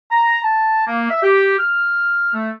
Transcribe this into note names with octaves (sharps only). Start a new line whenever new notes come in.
A#5
A5
A#3
E5
G4
F6
A3